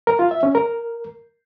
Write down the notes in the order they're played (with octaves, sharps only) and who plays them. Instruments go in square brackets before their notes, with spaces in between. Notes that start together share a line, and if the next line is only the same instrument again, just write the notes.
[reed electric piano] A#4
F4
E5
C#4
A#4